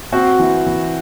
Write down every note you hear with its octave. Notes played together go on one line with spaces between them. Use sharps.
C4 F#4
E3
E3